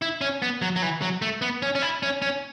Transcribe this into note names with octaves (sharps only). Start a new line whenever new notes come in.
E4
C#4
B3
F#3
F#3
E3
F#3
A3
B3
C#4
C#4
E4
C#4
C#4